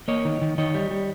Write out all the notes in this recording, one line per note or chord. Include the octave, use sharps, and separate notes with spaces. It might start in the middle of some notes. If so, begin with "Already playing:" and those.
A#3 C#5 D#5
D#3
D#3
D#3 C#5 D#5
G3
G3